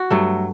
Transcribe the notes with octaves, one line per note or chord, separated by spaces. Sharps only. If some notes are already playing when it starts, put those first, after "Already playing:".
Already playing: F#4
G2 F#3 A3